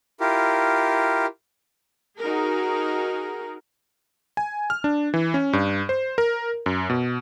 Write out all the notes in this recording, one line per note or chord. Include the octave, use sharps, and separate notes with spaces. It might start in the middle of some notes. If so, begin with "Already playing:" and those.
E4 F4 G4 A#4
D#4 F#4 G#4 A#4
G#5
F6
D4
E3
C#4
G2
C5
A#4
F#2
B2